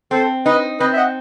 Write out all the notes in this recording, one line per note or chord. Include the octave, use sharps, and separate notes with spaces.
C4 A4 C5
D#4 B4 D#5
C4 B4 D#5
E5
D#5 F#5